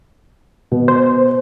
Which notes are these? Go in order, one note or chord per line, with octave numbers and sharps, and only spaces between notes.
B2
C5